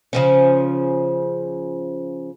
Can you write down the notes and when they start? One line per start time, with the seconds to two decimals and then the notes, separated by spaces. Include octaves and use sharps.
0.13 C#3 F3 C#4